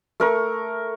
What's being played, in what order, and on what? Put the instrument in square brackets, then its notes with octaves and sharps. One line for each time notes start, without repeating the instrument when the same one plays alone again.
[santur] A3 A#4 C#6